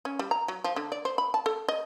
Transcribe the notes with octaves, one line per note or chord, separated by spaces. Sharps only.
C#4
G3
A#5
F#3
F3
D3
D5
C5
B5
A5
A4
D#5